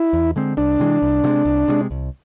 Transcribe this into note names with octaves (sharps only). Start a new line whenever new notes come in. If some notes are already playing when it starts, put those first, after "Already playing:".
Already playing: E4
E2
D3 G#3 C4
C2 D4
C3 E3 G#3
C2
C3 E3 G#3
C2
C3 E3 G#3
C2